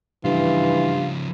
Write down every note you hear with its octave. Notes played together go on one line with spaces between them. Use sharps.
G2 C#3 E3 F3 F4